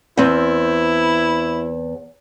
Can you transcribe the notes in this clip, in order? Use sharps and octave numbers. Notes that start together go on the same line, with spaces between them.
E2 C4 E4